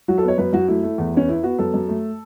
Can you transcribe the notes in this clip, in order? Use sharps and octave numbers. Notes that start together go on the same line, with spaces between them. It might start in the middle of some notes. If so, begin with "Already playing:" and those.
F#3 F#4
A4
B3 C#5
F#2 B4
F#2 F#4
A3 E4
A3
E2
B3 C#4
B3 E4
B3 F#4
F#2 A4
F#2
A3